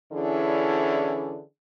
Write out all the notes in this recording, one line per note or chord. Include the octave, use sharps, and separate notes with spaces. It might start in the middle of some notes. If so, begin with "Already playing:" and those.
D3 E3 C#4 D4 E4 G#4